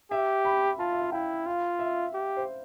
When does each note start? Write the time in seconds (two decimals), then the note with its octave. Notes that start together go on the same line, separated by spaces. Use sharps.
0.11 G4 E5
0.45 B5
0.79 F4 A5
0.93 E5
1.02 F5
1.12 E4 G5
1.46 F4 F5
1.79 E5
2.14 G4
2.37 C5